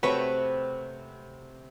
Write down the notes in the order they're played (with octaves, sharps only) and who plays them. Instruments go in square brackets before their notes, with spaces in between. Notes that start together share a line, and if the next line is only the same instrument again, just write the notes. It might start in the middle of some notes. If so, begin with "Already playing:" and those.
[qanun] C3 A3 G5 [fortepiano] F#4 B4 C#5